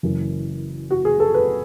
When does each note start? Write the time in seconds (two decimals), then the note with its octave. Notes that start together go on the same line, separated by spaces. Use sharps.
0.03 F#1 F#2 E3
0.91 F#4
1.05 G#4
1.20 A4
1.34 B4